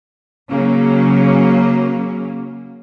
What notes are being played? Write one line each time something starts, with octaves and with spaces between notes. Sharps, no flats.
C#3 F#3 A#3 C#4